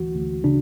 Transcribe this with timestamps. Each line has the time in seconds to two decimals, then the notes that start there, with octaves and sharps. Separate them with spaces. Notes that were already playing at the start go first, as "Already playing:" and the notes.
Already playing: D2 E3 F#4
0.16 D2
0.44 C#3 D4